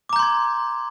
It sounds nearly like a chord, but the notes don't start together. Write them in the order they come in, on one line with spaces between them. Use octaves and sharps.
D6 A#5 G6 C6 G#6